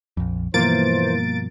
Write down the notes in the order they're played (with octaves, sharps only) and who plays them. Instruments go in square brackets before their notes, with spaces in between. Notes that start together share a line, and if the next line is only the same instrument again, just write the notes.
[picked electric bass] A#1 F2
[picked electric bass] G2 B2 F3 [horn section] E3 C5 [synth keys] A#3 A6 D7